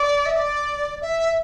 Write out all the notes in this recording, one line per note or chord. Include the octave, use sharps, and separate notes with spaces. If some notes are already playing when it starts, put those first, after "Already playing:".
Already playing: D5
E5
D5
E5